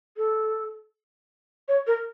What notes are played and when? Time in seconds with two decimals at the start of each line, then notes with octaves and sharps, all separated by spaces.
0.17 A4
1.68 C#5
1.87 A#4